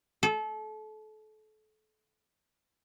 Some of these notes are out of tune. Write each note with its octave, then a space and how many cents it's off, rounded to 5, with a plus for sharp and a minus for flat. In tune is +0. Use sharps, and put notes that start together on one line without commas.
A4 -30